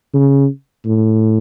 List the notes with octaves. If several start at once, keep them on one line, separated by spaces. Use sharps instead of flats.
C#3
A2